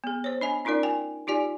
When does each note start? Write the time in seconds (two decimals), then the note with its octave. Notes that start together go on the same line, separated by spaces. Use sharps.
0.04 B3 G#4
0.24 C5 C#5
0.41 D4 D#5 G#5
0.65 C#4 D#4 F4 A#4 D5
0.83 G5 G#5
1.27 D#4 F4 G4 D5 G#5